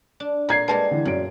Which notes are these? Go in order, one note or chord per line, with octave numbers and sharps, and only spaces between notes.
D4
A#2 A#5 G#6 C7
G3 G#3 A#3 B4 A5
D3 E3
F#2 A#2 D7